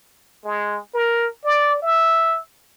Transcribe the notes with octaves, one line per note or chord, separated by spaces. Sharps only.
G#3
A#4
D5
E5